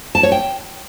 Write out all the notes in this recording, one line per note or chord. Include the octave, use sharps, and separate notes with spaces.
A5
C#5
G5